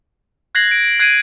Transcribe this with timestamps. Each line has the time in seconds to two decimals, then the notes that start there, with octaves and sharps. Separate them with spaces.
0.55 F#6 G#6 A#6 C7 F#7
0.71 D7
0.85 D7
0.99 F#6 G#6 C7 D7 D#7